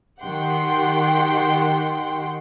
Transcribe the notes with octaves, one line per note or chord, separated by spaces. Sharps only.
D#3 G4 F#5 G5 C6